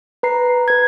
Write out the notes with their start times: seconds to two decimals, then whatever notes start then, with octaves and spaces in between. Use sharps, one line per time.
0.23 B4 A#5 C7
0.68 B4 G#6